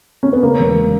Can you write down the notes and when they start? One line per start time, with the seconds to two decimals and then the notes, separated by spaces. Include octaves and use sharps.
0.23 C#4
0.33 B3
0.43 C#3 A#3
0.59 E1